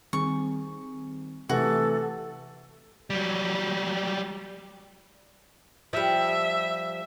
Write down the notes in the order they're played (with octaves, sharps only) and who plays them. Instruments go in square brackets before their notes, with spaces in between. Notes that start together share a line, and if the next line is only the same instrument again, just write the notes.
[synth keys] D#3 G3 C4 [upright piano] G#4 [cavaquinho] C#6
[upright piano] C3 E3 A3 [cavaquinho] F#4 [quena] A4
[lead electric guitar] F#3 G3
[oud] F3 G3 [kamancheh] E5